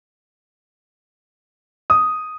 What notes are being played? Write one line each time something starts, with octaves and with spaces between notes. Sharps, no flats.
D#6